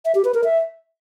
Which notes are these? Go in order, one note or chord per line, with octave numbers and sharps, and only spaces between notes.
E5
G4
B4
A#4
E5